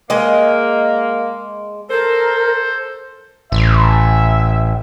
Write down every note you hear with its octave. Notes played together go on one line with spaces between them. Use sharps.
G#3 A#3 D#5
A4 A#4 C5
A1 E5